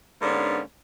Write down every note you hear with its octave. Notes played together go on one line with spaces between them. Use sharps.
G#2 D3 A#3 B3 C#4 D4